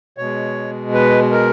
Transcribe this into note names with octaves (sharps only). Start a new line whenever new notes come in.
B2 G#3 C#5
B4
A#4